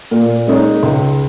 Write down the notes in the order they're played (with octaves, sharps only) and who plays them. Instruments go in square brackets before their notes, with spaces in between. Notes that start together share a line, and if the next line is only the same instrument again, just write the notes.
[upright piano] A#2
G#3 D#4 C#5
C#2